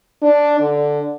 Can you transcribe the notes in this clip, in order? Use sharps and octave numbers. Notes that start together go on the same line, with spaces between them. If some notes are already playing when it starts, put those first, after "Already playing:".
D4
D3